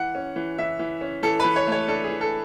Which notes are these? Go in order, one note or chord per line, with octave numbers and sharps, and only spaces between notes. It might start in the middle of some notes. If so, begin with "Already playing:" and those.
Already playing: E3 F#5
C#4
E3
E3 E5
E3
C#4
E3 A4
E3 B4
C#5
A3 C#5
D4 A4
G#4
E3
A4